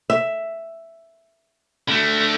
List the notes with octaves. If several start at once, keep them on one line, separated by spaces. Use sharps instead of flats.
E5
D3 A3